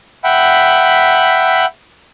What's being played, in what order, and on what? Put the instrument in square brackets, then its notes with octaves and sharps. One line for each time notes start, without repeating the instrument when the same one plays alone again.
[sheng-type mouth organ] E5 F#5 G5 B5